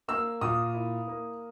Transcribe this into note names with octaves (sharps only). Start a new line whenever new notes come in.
A#3 E6
A#2 D#6
E4
A#3